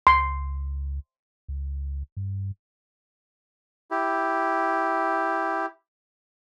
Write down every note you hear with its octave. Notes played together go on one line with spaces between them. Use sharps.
C#2 C6
C#2
G2
E4 G4